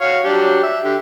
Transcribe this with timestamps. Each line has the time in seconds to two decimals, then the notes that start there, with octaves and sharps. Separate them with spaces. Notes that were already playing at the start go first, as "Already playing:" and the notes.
0.01 F#4 C#5 F5
0.24 F#3 D4 G4
0.63 E5
0.84 D3 G4